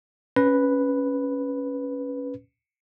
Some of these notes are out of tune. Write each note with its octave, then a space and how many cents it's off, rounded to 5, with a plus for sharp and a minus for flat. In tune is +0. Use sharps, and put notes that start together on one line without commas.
C#4 +0 B4 +0